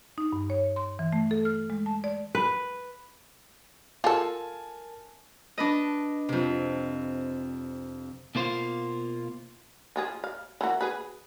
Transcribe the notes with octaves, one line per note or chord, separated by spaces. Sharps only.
D#4
G2
C#5
C6
E3
A3
A4
F6
G#3
A5
D5
B4
F4 A4 A#4 G#5 A5
D4 B4 D#5
F2 C3
B2 A#3 F4 C5 F5
F3 F4 G#4
F5
E3 A#3 F#4
G#4 B4